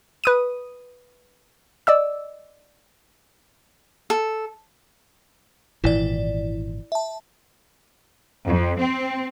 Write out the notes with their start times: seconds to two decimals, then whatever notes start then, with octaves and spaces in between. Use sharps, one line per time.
0.24 B4 D#6 D#7
1.87 D5 D#5 E6
4.10 A4
5.84 G#1 A#2 E3 E4 D5
6.92 E5 A5
8.48 F2
8.80 C4